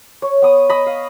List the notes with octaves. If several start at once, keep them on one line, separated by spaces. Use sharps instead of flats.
C#5
B3 D#6
D#5 B5
F5